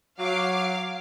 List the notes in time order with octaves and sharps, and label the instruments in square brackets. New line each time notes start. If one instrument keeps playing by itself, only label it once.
[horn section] F#3 [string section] F5 D6